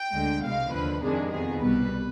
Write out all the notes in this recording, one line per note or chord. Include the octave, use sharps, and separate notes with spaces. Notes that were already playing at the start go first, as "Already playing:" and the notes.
Already playing: G5
D2 D3 G#3
C2 B2 G#3 F5
D#2 D3 F3 B4
F2 C3 D#3 G#3 D4 G#4
F2 D#3 B3 G#4
C2 B2 G3 B4